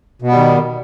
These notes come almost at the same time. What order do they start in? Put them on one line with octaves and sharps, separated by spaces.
B2 B3 G3 D#3